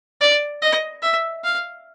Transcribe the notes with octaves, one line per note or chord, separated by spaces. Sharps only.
D5
D#5
E5
F5